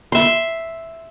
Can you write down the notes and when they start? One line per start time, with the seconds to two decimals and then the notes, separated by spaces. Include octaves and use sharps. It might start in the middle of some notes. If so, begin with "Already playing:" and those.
0.12 E5 C6